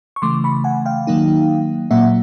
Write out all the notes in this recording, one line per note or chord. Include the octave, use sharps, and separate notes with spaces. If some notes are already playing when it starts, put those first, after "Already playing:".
C#6
C#3 E3 A3 C6 D6
B5 C#6
F#5 G#5
F5 G5
D#3 F#3 A#3 D#4
A#2 F#3 A#3 E5 F#5